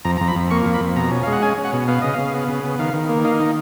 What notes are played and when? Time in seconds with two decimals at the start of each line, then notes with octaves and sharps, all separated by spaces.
0.05 F2 A#5
0.17 F2 A#5
0.28 B5
0.36 F2
0.51 A#3 C#6
0.66 F2
0.74 B5
0.81 F2
0.96 B2 A#5
1.11 C#4
1.23 G#3 F5
1.32 F#5
1.42 C#4 G#5
1.58 C#4
1.64 F#5
1.73 B2
1.88 B3 F5
2.01 C#3 D#5
2.14 C#3 F5
2.34 B3
2.49 C#3
2.64 B3
2.79 D#3 F5
2.94 D#3
3.09 A#3
3.25 D#4 F5
3.40 D#3